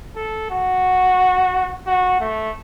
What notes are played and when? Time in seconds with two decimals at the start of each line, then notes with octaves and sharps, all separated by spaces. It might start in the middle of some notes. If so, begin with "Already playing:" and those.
0.16 A4
0.50 F#4
1.86 F#4
2.20 A3